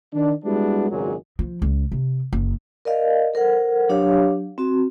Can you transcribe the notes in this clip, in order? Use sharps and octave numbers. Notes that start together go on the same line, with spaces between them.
D#3 D4
G3 G#3 B3 D4 E4 F#4
G#1 C#2 A#2 F#3 G#3 G#4
F3
C#2
C3
F#1
A#4 D5 D#5 F5
A4 A#4 C5 F#5
F#3 D4 G4 C#5 F5
C4 F#4